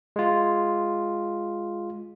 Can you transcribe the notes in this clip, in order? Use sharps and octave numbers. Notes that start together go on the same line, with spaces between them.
G#3 F4